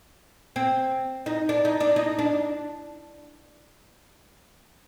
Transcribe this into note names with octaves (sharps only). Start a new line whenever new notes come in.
C4
D#4
D4
D#4
D4
D#4
D4